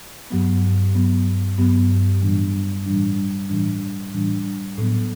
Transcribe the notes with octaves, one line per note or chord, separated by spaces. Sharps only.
G2 F#3 B3
G2 F#3 B3
G2 F#3 B3
A2 E3 G3 D4
A2 E3 G3 D4
A2 E3 G3 D4
A2 E3 G3 D4
A2 F#3 B3